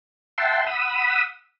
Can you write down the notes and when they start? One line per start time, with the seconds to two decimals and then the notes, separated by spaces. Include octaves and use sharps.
0.38 E5 F#5 G5 A5 C6
0.66 F#5 B5 D#6 E6